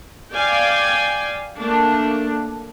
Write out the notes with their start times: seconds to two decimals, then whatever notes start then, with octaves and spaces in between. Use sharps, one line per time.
0.34 D5 F5 G5 G#5
1.58 A3 A#3 D4